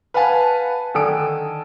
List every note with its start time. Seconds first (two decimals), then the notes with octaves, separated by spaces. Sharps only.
0.14 B4 F5 F#5 G#5 A5 B5
0.94 D3 D#3 A4 G#5 D#6 D7